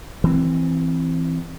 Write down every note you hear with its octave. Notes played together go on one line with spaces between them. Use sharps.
E3 C4